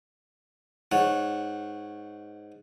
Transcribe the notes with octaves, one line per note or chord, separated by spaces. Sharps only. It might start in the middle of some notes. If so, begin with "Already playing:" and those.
G#2 C#5 F#5